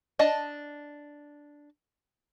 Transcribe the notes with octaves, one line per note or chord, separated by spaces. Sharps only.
D4 D#5 A5